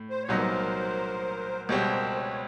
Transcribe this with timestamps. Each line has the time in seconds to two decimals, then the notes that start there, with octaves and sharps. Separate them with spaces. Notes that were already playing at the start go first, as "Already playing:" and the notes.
Already playing: A2
0.10 C5
0.23 C#5
0.29 C2 A#2 F#3 B3 D#4
0.37 A#4 C5
1.69 C#2 B2 G3 C4 B4 C#5
1.93 A#4 C5
2.16 B4 C#5